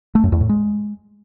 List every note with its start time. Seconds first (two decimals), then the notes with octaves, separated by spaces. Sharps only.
0.15 A3
0.24 F#2
0.32 E2
0.41 A2
0.49 G#3